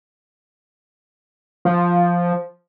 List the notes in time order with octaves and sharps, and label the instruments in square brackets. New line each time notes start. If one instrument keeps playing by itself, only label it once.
[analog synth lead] F3